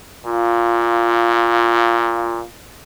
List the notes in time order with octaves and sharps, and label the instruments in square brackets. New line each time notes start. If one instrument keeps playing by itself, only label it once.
[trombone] A#2 [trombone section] F4